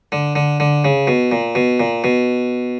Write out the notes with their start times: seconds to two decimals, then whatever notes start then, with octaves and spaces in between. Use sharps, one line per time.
0.12 D3
0.35 D3
0.60 D3
0.84 C#3
1.07 B2
1.32 A#2
1.55 B2
1.80 A#2
2.04 B2